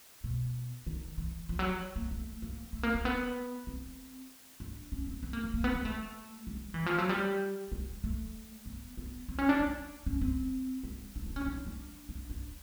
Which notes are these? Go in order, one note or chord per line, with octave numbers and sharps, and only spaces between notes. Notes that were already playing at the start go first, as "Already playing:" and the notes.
B2
D#3
E3
F3
F#3
A#3
A3
A#3
A3
A#3
A#3
B3
C4
D4
C#4
C4
B3
A#3
A#3
A#3
B3
A#3
A3
G#3
E3
F3
F#3
G3
G#3
A3
B3
B3
C4
C#4
D4
D4
C#4
C4
G#3
D4
D4
C#4
D4
D#4
D4
D4
D4